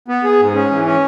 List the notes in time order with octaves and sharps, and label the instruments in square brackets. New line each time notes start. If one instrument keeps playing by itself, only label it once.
[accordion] B3
G#4
G#2
C#4
E3
C#4